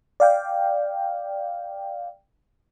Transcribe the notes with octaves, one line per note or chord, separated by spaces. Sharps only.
D5 F5 G5